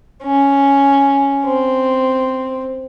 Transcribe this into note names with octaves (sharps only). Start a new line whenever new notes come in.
C#4
C4